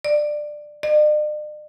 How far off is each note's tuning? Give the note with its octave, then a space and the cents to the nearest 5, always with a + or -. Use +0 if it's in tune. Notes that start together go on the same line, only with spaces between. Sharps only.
D5 +15
D5 +45